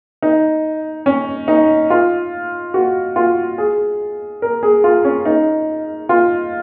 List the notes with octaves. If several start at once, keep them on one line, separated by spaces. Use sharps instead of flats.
D#4
C#4
D#4
F4
F#4
F4
G#4
A#4
G#4
F4
C#4
D#4
F4